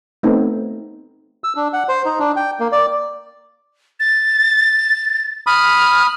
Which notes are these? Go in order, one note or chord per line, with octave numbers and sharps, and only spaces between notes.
A3 B3 C4 D#4
E6
D4
F#5
C5
D#4
D4
G5
A#3
D5
A6
B5 D#6 F6